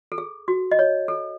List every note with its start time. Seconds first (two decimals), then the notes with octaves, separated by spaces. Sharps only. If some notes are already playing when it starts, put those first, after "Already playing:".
0.12 A4
0.18 G#4
0.48 F#4
0.71 D#5
0.79 C#5
1.08 A4